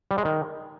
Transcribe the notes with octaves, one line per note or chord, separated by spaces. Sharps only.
G3
G#3
D#3